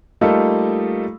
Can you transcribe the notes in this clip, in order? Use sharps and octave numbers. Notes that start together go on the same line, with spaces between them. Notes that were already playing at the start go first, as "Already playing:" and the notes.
G3 A3 A#3 D#4 F4 A4